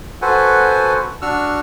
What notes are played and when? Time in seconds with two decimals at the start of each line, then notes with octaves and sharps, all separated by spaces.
0.22 F#4 A4 B4 C5 F#5 G#5
1.22 D4 F#4 C#6 E6 F6